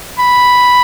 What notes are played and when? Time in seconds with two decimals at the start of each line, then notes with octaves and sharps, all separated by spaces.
0.18 B5